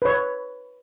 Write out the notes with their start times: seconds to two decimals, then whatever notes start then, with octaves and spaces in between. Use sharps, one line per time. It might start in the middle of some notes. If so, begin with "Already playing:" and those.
0.02 B4 C#5